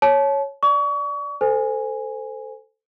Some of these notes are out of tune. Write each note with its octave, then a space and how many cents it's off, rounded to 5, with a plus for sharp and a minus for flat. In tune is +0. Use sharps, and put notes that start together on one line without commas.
C#5 +0 A5 -30
D5 +0 C#6 +35
A4 +10 C5 -25 G#5 +0